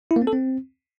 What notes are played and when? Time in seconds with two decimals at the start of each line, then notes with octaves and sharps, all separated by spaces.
0.11 E4
0.16 A#3
0.22 C4
0.27 A4
0.33 C4